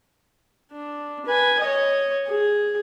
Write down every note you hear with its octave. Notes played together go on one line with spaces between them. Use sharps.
D4
B4 G#5
C#5 D#5
G#4